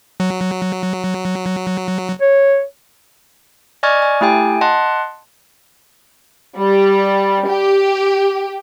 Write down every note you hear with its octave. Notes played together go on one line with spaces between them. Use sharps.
F#3
C#5
D5 D#5 G#5 C#6 F6 G#6
G#5
A3 E4 G4 G5 G#5
D#5 F#5 A5 C6 F#6
G3
G4